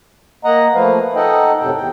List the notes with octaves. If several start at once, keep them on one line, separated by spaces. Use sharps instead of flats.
A#3 D#5 F#5 A#5
F3 A3 A#3 B4 F5
D#4 A4 D#5 F#5 G5
F#2 A2 C3 A4 G5
E2 G5